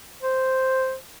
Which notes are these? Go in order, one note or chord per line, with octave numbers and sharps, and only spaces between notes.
C5